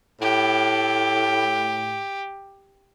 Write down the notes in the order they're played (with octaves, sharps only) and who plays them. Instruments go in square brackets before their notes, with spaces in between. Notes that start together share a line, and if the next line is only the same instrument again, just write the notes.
[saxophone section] A2 [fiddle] G4